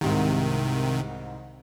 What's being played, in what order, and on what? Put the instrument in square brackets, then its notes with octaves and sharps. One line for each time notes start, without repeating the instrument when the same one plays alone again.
[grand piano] C2 G#2 [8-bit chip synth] C3 D#3